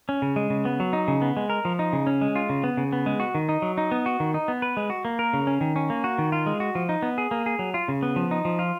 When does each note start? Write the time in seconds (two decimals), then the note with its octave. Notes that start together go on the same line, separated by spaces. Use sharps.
0.09 C#4
0.22 C#3
0.36 G#3
0.50 C#3
0.65 B3
0.80 F#3
0.93 D#4
1.08 C#3
1.22 B3
1.37 G#3
1.50 A#4
1.65 F3
1.79 D#4
1.93 C#3
2.07 C#4
2.21 G#3
2.36 F4
2.49 C#3
2.64 B3
2.77 C#3
2.92 B3
3.06 G#3
3.20 F#4
3.35 D#3
3.49 D#4
3.62 F#3
3.78 D#4
3.91 B3
4.06 F#4
4.20 D#3
4.34 D#4
4.48 B3
4.62 B4
4.77 G#3
4.90 F#4
5.05 A#3
5.19 A#4
5.33 C#3
5.47 C#4
5.61 D#3
5.76 C#4
5.90 A#3
6.04 F#4
6.19 D#3
6.32 F4
6.46 G#3
6.60 F#4
6.75 F3
6.89 D#4
7.02 B3
7.18 G#4
7.31 A#3
7.46 G#4
7.59 F#3
7.74 F4
7.88 C#3
8.03 B3
8.16 F3
8.31 D#4
8.45 F3
8.59 F4